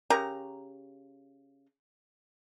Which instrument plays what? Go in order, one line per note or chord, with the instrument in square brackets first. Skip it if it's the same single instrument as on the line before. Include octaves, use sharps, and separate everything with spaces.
[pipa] C#3 G4 A#4 A#5